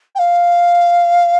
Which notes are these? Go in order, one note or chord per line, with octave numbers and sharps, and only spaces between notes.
G5
F5